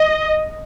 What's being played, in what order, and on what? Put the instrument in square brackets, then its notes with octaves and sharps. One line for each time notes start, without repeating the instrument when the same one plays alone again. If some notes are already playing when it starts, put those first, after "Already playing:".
Already playing: [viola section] D#5